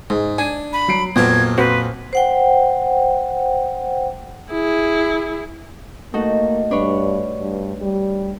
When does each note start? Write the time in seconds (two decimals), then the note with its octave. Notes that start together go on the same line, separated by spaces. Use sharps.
0.10 G#2 G#3
0.38 D4 G#5
0.73 B5
0.88 F#3 C7 D7
1.16 F2 A#2 F#3 B3 A5 G#6
1.58 C4 F#4 B4 C5
2.13 C5 F#5 G5
4.51 E4 G#4
6.14 A3 A#3 D#4 F#4
6.71 G2 D4 B4 C#5
7.41 G2
7.82 G3